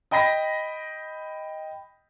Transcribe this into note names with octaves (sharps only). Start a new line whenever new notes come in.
D#5 G5 B5 A#6 B6